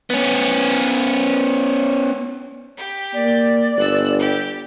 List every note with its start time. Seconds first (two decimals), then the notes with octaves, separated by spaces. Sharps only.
0.10 B3 C#4
2.77 G4
3.14 A#3 D5
3.77 G1 E6 F#6
4.19 G4